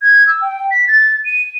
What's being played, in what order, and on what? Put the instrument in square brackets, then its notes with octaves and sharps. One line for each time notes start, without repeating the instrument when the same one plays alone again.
[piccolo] G#6
E6
G5
B6
A6
D#7